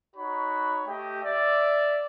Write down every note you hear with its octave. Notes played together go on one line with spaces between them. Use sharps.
D#4 F#4 C#5 B5
A3 G4 D#5 G5
D5 E5